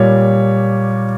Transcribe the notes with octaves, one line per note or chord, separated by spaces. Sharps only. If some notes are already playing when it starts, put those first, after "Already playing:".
Already playing: A#2 G3 C#5